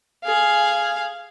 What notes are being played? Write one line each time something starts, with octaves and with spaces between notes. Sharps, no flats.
G#4 F5